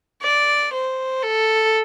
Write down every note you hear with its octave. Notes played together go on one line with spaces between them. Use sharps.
D5
C5
A4